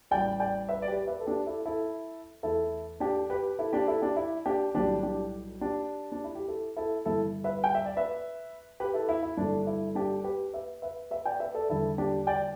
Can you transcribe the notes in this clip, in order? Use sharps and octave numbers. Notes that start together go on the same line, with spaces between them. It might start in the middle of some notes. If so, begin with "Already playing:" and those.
A1 A2 G3 D5 G5
D5 G5
B4 E5
D5
G4 B4
B4 E5
A4
D4 G4
E4 A4
E4 A4
E2 E3 A3 E4 A4
D4 G4
G4 B4
E4 A4
D4 G4
E4 A4
D4 G4
E4
D4 G4
B1 A2 E3 G3 D4 G4
D4 G4
D4 G4
D4
E4
G4
E4 A4
E4 A4
G1 G2 E3 G3 E4 A4
B4 E5
G5
E5
D5
B4 E5
G4 B4
E4 A4
E4
E4
G1 G2 E3 A3 D4
E4
D4 G4
G4 B4
B4 E5
B4 E5
B4 E5
D5 G5
B4 E5
A4 D5
E2 D3 G3 E4 A4
D4 G4
D5 G5